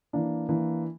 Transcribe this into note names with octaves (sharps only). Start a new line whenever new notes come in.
E3 A#3 D4
E3 A#3 D4